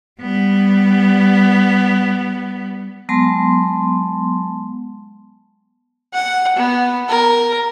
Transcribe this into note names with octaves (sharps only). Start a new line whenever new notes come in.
G3 B3
F#3 G#3 B3 A5 C6
F#5
B3
A#4